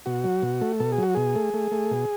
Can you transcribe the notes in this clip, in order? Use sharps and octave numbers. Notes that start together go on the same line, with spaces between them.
B2 F#4
F#3
B2
A3
B2 A4
G#4
F#3 F#4
B2 G#4
A3
A3
A3
B2